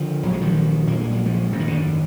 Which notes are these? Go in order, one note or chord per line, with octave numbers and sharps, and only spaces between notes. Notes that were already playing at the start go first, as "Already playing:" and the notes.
Already playing: D3 F3
A#1 A#2 F#3 G#3
D#3 F#3
A#1 A#2 A#3
G#3
F#3
F3 G#3
G#1 F#2 D3
D#3
D3